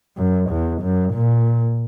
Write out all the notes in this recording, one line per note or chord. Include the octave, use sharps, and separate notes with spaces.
F#2
E2
F#2
A#2